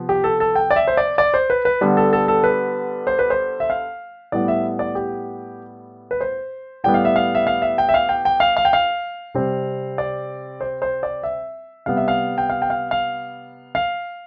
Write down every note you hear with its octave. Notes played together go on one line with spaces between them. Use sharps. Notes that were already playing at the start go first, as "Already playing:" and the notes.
Already playing: C3 F3 B3
G4
A4
A4
G5
D5
E5
C5
D5
D5
C5
B4
B4
D3 G3 B3
A4
A4
A4
B4
C5
B4
C5
E5
F5
A2 G3 B3 D5
E5
D5
G4
B4
C5
A2 G3 B3 G5
F5
E5
F5
E5
F5
E5
G5
E5
F5
G5
G5
F5
F5
G5
F5
C3 G3 C4
D5
C5
C5
D5
E5
C3 G3 B3 F5
E5
F5
G5
F5
G5
F5
F5
F5